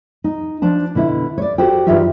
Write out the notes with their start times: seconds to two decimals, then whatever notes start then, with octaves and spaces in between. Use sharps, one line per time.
0.24 D#4
0.62 F3 D4 A5
0.95 B2 D3 E4
1.38 C#5 D5
1.58 F#4 G4 A4 C5 G5
1.87 G2 E3 D#4 F4 G4 E5